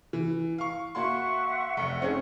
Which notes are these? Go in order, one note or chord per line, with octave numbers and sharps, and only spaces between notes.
E3
F5 C#6
A#3 F#4 E5 F#5 C6 C#6
F1
C4 C#4 G#4